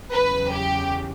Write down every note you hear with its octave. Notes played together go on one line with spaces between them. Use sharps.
E2 C#3 F#3 B4
G4